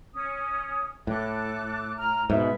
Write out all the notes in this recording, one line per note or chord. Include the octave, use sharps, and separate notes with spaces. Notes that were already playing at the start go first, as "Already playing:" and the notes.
C#4 D#6
A2 A4 D6 F#6
A#5 F6
G#2 B2 B4 E5